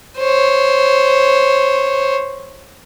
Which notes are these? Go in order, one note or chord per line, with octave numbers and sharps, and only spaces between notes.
C5 C#5